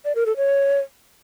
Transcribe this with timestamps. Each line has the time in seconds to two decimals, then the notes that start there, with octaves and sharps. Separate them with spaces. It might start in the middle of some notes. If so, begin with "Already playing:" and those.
0.05 D5
0.15 A#4
0.26 A4
0.37 C#5